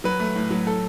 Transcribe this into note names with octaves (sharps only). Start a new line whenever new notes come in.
F#3 B4
A3
A2
F#3
A4